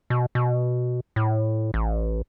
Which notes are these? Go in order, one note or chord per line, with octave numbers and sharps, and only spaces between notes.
B2
B2
A2
A1